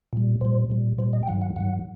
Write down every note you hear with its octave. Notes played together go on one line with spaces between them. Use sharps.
A#2 G3
A#2 G3 C5
A#2 G3
A#2 G3 C5
D#5
G5
G2 D#3 F#3 F#5
F#5
G2 D#3 F#3 F#5